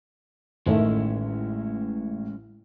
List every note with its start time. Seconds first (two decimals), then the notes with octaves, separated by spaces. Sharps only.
0.67 A1 D#3 G#3 A3 C#4 E4